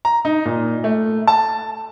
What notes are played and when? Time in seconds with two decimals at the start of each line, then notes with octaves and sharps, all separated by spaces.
0.05 A#5
0.25 D#4
0.45 A#2
0.84 A3
1.27 A5